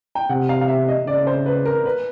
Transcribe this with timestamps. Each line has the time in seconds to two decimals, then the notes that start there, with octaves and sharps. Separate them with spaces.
0.15 G5
0.29 C3 F#5
0.49 F5
0.61 F5
0.68 E5
0.88 D#5
1.07 C#3 D5
1.27 C5
1.46 B4
1.65 A#4
1.85 B4